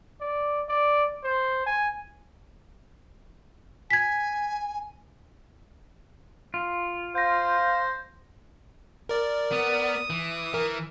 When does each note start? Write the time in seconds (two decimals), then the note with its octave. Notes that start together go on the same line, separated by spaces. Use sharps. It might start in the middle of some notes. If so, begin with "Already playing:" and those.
0.21 D5
0.68 D5
1.24 C5
1.66 G#5
3.90 G#5 G#6 B6
6.54 F4
7.15 C5 F5 G6 A#6
9.09 A#4 D5
9.52 B3 D#6
10.10 E3
10.54 E3 A#4